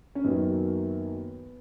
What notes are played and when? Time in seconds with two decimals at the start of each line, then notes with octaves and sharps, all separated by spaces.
0.15 C#4
0.24 F#2 D#3 F#3 A#3 B3